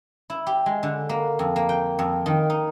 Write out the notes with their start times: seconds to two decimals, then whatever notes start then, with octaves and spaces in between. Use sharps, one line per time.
0.30 E4
0.46 G4
0.66 G#3
0.83 D3
1.09 A#3
1.39 F2
1.56 A#3
1.69 G5
1.99 F2
2.26 D#3
2.50 D#4